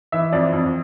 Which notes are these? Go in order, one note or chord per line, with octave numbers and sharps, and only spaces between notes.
E3 E5
F2 D5
F2